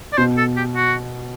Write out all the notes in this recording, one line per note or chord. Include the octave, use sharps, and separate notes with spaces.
D5
B2 C5
A4
G4
F#4